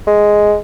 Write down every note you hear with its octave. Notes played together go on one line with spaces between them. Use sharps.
G#3